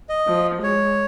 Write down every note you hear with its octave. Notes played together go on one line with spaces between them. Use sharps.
D#5
F3
G#3 C#5